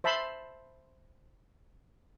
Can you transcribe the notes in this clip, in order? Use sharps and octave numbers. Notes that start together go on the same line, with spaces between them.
C5 E5 A5 B5 C6